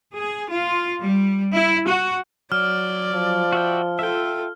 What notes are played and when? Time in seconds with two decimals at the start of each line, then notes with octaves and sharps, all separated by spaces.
0.15 G#4
0.51 F4
1.01 G3
1.54 E4
1.88 F#4
2.52 F#3 D5 F6
3.13 F3
3.53 F#4 E5 G5
3.99 F4 A4 E5 G5